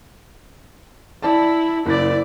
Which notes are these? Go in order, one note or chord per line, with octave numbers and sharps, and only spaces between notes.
E4 D5 A5
F#1 E4 D5 A6